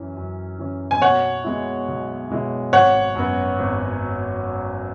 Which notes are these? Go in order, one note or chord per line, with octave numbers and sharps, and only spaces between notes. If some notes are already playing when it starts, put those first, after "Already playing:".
Already playing: F#2 E3 C#4
F#2
E3 C#4
G#5
B1 C#5 F#5
B2 G#3 E4
B1
B2 G#3 E4
G#1 C#5 F#5
F#2 F#3 B3
G#1